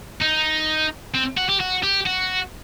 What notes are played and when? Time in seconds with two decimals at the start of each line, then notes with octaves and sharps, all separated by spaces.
0.22 D#4
1.15 C4
1.38 F#4
1.49 G4
1.61 F#4
1.84 G4
2.07 F#4